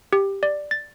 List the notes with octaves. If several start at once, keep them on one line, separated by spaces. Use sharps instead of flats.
G4
D5
A6